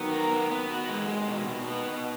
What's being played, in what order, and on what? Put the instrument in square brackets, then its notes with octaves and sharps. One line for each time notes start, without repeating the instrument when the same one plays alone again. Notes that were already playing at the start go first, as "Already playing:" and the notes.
Already playing: [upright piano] D#3 F#3 [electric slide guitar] B3
[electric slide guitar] A#4
B3
B3
F#4
G#3
G#3
B2
B2
B3
B2